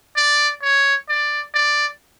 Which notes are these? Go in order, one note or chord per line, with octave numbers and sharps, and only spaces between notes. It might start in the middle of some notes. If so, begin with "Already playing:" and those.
D5
C#5
D5
D5